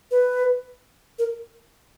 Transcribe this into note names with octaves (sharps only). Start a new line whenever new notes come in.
B4
A#4